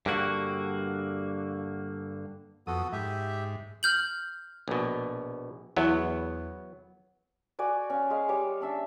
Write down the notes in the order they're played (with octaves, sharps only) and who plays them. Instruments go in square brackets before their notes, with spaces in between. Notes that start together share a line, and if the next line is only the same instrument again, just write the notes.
[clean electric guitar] G2 D3 A#3 F#4
[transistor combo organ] F2 D#6 [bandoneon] B3 F#4 A4
[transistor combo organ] G#2 [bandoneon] G4 E5
[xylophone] F6 G6 F#7
[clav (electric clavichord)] A#1 B2
[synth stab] E2 [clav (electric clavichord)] F#3 B3
[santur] F#4 D5 G#5 D6
C#4 F5
G#3 F5
G3 G4 C#5 D6
C#4 D4 E5 E6